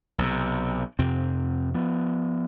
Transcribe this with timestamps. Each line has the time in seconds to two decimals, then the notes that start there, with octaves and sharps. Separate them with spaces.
0.18 B1 C3
0.99 F2 C3 C4
1.74 F3 B3